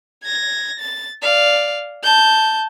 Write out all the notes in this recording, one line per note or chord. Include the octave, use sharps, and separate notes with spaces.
G#6 A#6
A6
D5 F5
A5 G6